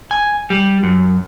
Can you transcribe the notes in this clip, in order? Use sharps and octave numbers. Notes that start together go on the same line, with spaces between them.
G#5
G3
F#2